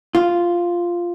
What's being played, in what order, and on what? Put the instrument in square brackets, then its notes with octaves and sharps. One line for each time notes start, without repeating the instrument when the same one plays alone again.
[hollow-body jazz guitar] F4